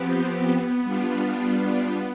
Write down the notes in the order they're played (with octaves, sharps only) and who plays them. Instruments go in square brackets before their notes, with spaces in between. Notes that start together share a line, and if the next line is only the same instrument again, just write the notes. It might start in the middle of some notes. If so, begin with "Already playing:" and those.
Already playing: [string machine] F3 C4 G4 [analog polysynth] B3
[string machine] G3 D4 F4